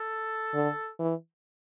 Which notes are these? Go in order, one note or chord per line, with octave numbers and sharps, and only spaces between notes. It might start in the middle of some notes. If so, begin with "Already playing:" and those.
Already playing: A4
D3
E3